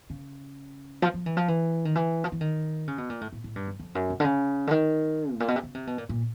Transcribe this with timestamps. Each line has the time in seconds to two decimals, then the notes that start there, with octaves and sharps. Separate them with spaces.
0.10 C#3
1.02 F3
1.14 F3
1.26 E3
1.37 F3
1.48 E3
1.85 D#3
1.95 E3
2.24 F3
2.32 E3
2.41 D#3
2.88 C#3
2.98 B2
3.10 A#2
3.21 A2
3.32 A2
3.44 A2
3.56 G2
3.67 F2
3.79 F2
3.95 F#2
4.10 C3
4.20 D3
4.25 C#3
4.67 D3
4.71 D#3
5.33 A2
5.40 A#2
5.48 B2
5.56 C3
5.63 C#3
5.75 C3
5.87 B2
5.98 A#2
6.09 A#2